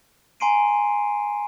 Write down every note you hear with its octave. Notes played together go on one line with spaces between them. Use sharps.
G#5 A#5 C6 C7 D7 D#7